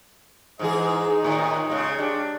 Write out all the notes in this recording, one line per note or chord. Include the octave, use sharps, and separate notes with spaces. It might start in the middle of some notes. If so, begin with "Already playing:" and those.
G#2 E3 G#4 D#5
D#4
D#2 A2 D#3
C#3 G#3
D4 G4